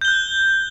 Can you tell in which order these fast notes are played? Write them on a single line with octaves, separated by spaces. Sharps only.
G6 G7 F#6